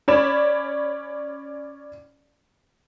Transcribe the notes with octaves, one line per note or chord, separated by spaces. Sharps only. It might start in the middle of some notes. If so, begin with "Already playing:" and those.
C#4 C#5 D5 B5 E7